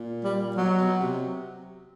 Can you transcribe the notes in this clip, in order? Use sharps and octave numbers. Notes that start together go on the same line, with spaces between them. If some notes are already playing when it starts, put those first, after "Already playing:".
Already playing: A#2
G3
B2 F#3
B2
C3